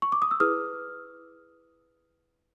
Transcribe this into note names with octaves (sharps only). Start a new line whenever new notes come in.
C#6
D6
D#6
E6
E4 G#4 B4 D#6 F6